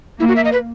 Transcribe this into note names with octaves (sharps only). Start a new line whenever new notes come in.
A#3 E4
F#4
E5
D#5
B4